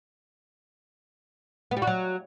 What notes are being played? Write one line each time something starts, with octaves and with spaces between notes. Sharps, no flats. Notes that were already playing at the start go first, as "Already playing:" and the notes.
B3
G3
F#4
F#3